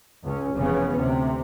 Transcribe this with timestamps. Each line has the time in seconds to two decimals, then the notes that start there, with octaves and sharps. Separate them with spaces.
0.24 C#2 C#4
0.55 F1 C#3 E3 B3 C#4
0.98 D2 C3